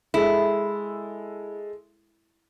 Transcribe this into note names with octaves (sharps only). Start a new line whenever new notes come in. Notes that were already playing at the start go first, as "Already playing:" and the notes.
G#3 E4 A4